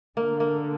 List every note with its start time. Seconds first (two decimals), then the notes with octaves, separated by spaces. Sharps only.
0.16 D3 A#3
0.40 A#3